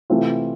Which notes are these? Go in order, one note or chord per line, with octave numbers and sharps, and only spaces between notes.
C3 E3 A3 C4 F4